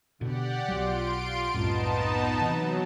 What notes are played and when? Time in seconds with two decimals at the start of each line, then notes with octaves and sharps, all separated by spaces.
0.21 B2 D3 G4 D5 F#5
0.68 B1 F#3 F4 C6 D7
1.54 C2 F#2 A2 B3 D#4 A5
2.41 C3 E3 F#3